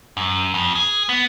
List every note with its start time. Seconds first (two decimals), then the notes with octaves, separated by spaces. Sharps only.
0.17 F#2
0.54 F2
0.75 G#4
1.09 B3